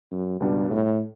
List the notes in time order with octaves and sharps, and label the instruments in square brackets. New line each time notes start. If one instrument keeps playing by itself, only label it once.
[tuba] F#2
[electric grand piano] C#2 B2 G3 D4 [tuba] G2
[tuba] A2